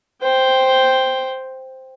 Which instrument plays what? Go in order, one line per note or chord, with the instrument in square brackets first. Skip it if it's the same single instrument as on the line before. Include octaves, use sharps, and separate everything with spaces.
[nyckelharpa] C5 G5